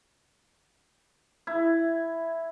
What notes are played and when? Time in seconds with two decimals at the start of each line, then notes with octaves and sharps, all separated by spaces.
1.47 E4